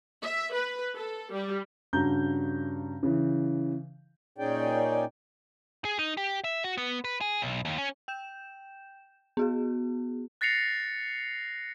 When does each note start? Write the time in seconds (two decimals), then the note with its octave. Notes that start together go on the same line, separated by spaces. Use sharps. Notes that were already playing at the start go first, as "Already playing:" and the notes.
0.23 E5
0.54 B4
0.96 A4
1.32 G3
1.93 G2 C#3 F#4 A#5 G6
3.03 C#3 E3
4.38 A#2 C#4 D#4 G#4 D5 G5
5.85 G#4
5.99 D#4
6.17 G4
6.44 E5
6.64 F#4
6.78 B3
7.04 B4
7.21 G#4
7.42 B1
7.65 D#2
7.78 C#4
8.08 G5 G6 E7
9.37 B3 F#4 G#4
10.41 F#6 A6 A#6 C7 C#7 F7